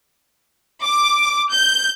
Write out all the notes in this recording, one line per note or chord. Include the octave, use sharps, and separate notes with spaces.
D6
G6